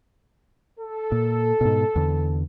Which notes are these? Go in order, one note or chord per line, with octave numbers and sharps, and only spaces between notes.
A4
A#2
G#2 B2
E2 D3